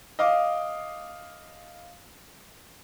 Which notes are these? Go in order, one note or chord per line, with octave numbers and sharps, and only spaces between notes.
D#5 F5 D6